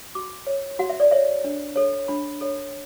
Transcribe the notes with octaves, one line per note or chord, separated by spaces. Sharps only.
F#4 D6
C#5
F#4 F#5
E5
D5
C#5 E5
D4
A4 C#5
D4 B5
A4 C#5